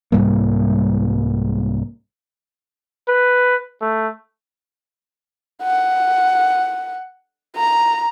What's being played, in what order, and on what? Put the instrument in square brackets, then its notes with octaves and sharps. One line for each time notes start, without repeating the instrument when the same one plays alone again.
[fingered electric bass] C2 G#2 G3 A#3
[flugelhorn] B4
A3
[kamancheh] F#5
A#5